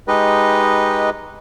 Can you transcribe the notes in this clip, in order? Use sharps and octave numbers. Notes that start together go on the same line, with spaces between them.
G#3 D#4 G4 B4 D#5